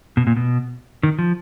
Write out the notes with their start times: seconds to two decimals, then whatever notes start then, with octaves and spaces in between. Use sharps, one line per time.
0.17 B2
0.27 A#2
0.37 B2
1.03 D#3
1.19 F3